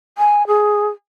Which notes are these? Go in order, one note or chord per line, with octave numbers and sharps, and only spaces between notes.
G#5
G#4